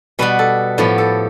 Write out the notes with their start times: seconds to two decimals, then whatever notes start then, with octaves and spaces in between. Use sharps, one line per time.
0.19 B2 G3 B3 B4
0.39 A4
0.78 A2 F3 B3 G4
0.98 A4